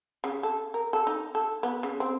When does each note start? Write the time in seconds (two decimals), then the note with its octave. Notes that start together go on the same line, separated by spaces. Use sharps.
0.24 C#3
0.43 A4
0.74 A#4
0.93 A4
1.07 D#4
1.35 A4
1.63 B3
1.83 C#3
2.00 C4